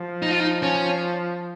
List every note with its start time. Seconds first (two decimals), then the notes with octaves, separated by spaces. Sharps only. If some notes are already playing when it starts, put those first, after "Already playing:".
Already playing: F3
0.23 D#4
0.31 F4
0.40 D#4
0.63 C#4